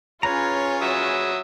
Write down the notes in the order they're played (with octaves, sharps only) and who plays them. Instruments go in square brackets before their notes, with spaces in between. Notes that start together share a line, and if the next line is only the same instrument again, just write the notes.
[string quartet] C#4 C#5 [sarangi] F4 [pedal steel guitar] G#4 B4 A#5
[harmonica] F#3 E5 D#6